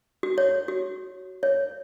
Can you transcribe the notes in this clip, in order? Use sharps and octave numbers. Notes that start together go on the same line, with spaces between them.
F#4
C#5
F#4
C#5